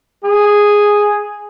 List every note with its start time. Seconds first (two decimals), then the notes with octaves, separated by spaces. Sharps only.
0.24 G#4